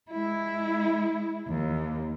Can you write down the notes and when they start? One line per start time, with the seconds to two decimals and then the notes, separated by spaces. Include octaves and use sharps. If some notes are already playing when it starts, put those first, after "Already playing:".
0.11 G#3 E4
1.48 D#2